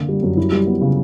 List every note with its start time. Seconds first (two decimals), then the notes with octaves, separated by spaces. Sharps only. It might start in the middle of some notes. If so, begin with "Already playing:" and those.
Already playing: D3 A#3
0.09 G3
0.23 F#2
0.37 E4
0.52 G3
0.67 B3
0.81 C#3